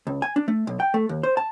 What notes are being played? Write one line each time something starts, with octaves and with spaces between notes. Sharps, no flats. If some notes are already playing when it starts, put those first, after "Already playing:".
C#2
G#5
D4
A3
B1
G5
A3
D#2
C5
A5